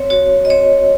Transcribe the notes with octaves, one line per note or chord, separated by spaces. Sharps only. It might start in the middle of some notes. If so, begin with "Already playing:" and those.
Already playing: C4 C#5
F#4 C#5
D#5
C4 C#5